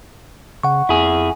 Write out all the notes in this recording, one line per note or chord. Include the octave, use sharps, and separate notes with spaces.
C#3 F#5 C#6
F2 E4 G#4